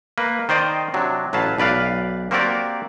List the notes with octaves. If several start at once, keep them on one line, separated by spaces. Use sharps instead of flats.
A#3 B4
D#3 C5 D5 D#5 G5
C3 F#3 D4
A1 F#3 B4 F5 A5
B1 B4 D5 F5
A#3 C4 F#4 G4 A#4 D5